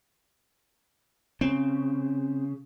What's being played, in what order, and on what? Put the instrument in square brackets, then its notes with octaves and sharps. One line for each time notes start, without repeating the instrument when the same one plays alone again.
[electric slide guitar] C#3 [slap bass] C4